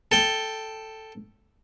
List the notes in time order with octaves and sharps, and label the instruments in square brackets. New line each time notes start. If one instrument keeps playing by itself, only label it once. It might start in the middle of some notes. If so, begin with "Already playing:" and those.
[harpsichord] A4 G5